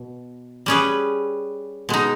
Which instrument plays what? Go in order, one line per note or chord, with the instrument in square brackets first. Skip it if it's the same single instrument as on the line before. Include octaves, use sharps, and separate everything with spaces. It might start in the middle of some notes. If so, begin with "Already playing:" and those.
Already playing: [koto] B2
G3 C#4 G#4 B4
B2 G#3 D#4